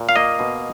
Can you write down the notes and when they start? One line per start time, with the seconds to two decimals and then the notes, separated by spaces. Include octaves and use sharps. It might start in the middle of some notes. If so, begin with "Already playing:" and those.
Already playing: A#2
0.09 F5
0.16 A#3 D#5
0.39 B2